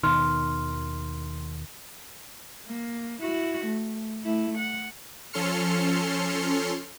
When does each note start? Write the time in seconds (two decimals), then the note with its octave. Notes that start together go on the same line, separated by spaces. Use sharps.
0.03 D#2 B2 D#3 C6 F6
2.67 A#3
3.22 E4 F#4
3.65 A3
4.25 A3 E4
4.58 F#5
5.33 F3 C#4 A4 C6 F6 C#7